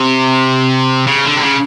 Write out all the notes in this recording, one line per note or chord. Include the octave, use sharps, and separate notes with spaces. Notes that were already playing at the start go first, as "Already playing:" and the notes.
Already playing: C3
C#3
D3
C3
C#3